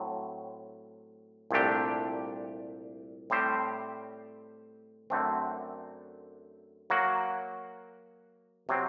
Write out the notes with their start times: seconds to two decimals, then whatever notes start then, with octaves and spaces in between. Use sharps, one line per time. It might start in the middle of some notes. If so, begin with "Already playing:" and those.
Already playing: A2 F#3 C4
1.51 C2 A#2 A3 D4 G4
3.30 A2 G3 C4 G4 C5
5.10 F#2 D3 A3 C4
6.90 F#3 A#3 F#4
8.69 C3 F#3 C4